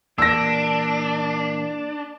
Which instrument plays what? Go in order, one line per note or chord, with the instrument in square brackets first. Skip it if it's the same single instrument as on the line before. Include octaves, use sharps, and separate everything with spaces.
[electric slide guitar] A#2 E3 A#3 [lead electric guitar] D4 [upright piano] E6 A#6